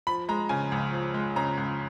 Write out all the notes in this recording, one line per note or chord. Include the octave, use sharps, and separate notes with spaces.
F3 B5
G#3 A#5
C#3 G#5
C#2
F3
G#3
C#3 A#5
C#2